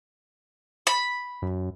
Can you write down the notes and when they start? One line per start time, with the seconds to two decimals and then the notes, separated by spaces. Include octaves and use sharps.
0.87 B5
1.42 F#2